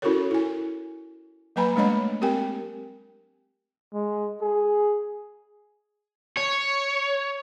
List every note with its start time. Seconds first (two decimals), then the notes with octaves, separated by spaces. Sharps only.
0.02 C#4 E4 F#4 A4 A#4 C#5
0.31 E4 G#5
1.56 F#3 A#3 B4 G#5 A#5 B5
1.76 G#3 A3 D4 C#5 D#5 B5
2.21 C4 G4 A#4 G5 G#5
3.94 G#3
4.42 G#4
6.37 C#5